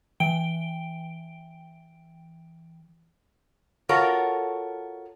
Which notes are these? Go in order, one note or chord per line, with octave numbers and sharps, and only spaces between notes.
E3 G5 D7 G7
F4 F#4 A4 A#4 C#5